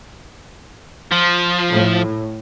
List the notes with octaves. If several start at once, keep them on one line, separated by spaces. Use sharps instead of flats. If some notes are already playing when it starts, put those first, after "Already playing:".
F3
A2